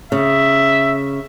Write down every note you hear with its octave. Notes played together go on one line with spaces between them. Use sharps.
C#3 E5